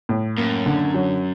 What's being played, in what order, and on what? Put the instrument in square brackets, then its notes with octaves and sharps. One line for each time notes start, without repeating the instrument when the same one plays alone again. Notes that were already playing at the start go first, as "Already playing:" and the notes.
[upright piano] A2
[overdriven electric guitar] F#2 [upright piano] A#3
[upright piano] D3
F#3